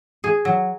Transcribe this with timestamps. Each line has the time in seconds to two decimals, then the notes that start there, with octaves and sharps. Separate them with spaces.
0.24 G#4
0.45 F#3